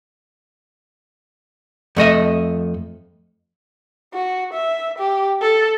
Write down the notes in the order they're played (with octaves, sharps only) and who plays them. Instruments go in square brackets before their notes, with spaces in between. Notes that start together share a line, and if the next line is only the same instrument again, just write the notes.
[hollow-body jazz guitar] F2 A3 D#5 E5
[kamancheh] F#4
E5
G4
A4